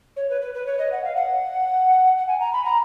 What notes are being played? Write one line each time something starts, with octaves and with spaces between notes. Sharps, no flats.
C#5
B4
B4
B4
C#5
D#5
F#5
F5
F#5
F#5
G#5
A#5
B5
A#5